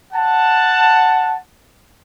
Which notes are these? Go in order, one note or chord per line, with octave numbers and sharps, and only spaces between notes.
F#5 A5